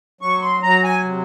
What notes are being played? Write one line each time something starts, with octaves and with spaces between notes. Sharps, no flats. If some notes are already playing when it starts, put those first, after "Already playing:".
F#3 C#6
C6
F#3 A#5
G#5
C3